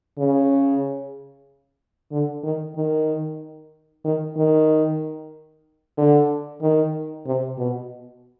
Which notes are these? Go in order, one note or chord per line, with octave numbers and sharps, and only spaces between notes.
C#3
D3
D#3
D#3
D#3
D#3
D3
D#3
C3
B2